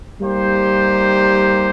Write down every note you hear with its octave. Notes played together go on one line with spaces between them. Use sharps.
G3 A#3 D#4 G4 C5